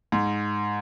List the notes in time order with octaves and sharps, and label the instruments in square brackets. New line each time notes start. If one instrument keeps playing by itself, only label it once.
[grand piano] G#2